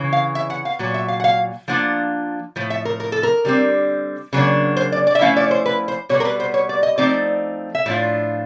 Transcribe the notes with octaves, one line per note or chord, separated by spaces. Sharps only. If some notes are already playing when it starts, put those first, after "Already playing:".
Already playing: C#3 E3
F5
E5
F#5
F5
A#2 F#3
E5
F5
F#5
F5
F3 A#3 D4 F4 F#5
A2 F3
E5
A#4
A#4
A4
A#4
D3 G3 C4
C#3 F#3 A#3 D4
C5
D5
D5
E5
F3 A3 C#4 E4 F5
D5
C#5
C5
B4
C5
B2 G3 B3 C#5
A#4
B4
C5
C#5
D5
D#5
F3 A3 C4 D#4 D5
E5
A2 F3 D4 F4